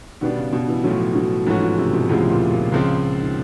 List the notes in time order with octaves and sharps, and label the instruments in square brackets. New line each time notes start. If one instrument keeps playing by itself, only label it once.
[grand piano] B2 G3 B3 D4 [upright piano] D#3
[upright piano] C#3
B2
E3
[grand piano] A2 F3 A3 C#4 [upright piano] F#3
[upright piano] F#3
[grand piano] G#2 E3 A3 C#4 F#4 [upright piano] F3
[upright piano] F3
C3
B2
[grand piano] D2 C#3 F3 G#3 [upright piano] A2
[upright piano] A#2
A#2
[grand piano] C#2 C#3 F3 G#3 C4
[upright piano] D#3